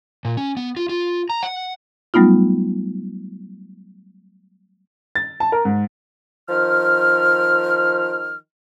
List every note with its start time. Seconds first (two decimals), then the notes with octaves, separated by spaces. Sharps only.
0.25 A#2
0.37 C#4
0.57 B3
0.77 F4
0.89 F4
1.30 A#5
1.43 F#5
2.14 F#3 G3 A3 B3 D#4 F4
5.15 A6
5.40 A5
5.52 A#4
5.65 G#2
6.49 D#3 F3 F6